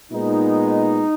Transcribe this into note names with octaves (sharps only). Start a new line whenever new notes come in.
A#2 G#3 B3 D#4